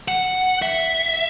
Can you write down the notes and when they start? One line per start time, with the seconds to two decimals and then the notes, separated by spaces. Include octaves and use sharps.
0.08 F#5
0.62 E5